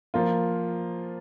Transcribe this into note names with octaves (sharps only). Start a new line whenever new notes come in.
F3 A#3 F4